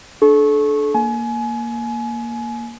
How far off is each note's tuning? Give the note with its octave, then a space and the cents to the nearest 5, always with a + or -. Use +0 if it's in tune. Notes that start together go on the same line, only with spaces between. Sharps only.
D4 +5 A4 -35 C#6 -20
A#3 +0 G#5 +30